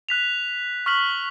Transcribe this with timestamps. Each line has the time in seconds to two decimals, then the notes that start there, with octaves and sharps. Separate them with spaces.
0.09 F#6 B6 F7
0.86 C#6 F6 B6 F#7